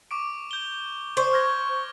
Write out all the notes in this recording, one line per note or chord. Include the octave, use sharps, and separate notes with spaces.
C#6 D6 D7
G6 G7
C5 C#6
F6 G#6 A#6